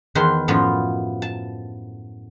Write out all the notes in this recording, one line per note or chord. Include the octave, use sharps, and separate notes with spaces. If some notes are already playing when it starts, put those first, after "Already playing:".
E2 D#3 B4 C5 C6
F#2 A2 F3 B3 F4
A5